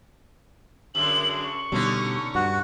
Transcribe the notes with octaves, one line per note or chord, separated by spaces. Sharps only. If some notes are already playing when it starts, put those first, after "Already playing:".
F#2 D3 G#3 F#7
C#6
B2 D3 G3 C#4 D#4
G2 F#4